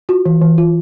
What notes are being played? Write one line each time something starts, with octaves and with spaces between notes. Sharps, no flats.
F4 F#4
E3
E3
F4